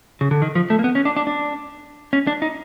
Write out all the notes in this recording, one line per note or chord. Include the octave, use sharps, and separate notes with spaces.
C#3
D3
D#3
F3
A3
A#3
B3
C#4
D4
D4
D4
C#4
D4
D#4